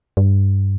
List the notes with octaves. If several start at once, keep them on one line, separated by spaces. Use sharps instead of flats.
G2